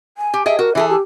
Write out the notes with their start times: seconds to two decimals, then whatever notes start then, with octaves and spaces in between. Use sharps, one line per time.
0.18 G#5
0.34 G4
0.46 G#4 D#5 E5 G5
0.59 F#4 A#4
0.75 E3 G#4 A4 E5
0.90 G4